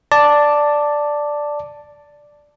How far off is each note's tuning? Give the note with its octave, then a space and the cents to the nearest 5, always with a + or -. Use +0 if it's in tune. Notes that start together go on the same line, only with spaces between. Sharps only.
D5 +0 A5 +5